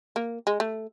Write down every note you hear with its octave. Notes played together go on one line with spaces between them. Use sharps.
A#3
G#3
A3